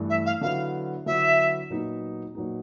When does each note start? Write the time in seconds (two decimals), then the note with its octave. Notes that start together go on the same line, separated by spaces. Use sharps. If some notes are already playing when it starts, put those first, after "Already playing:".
Already playing: G2 E3 A3
0.09 E5
0.25 F5
0.41 D3 F#3 B3 E4 F5
1.06 D3 F#3 B3 E4 E5
1.70 A#2 F#3 B3 D#4
2.35 A#2 F#3 B3 D#4